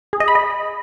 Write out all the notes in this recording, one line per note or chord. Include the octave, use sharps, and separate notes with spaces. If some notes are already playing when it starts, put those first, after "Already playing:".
G#4
D#5
B5
D#5